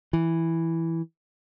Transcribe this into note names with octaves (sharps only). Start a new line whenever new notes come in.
E3